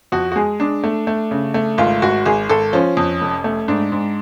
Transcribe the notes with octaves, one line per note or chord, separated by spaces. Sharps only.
F2 F#4
F#4
G#3 G#4
G#3 D4
A3
A3
C#3
A3
G#1 F4
G#1 F#4
G#1 G#4
G#1 A4
F3 C#4
F2
F1
A3
G#2 D4
G#2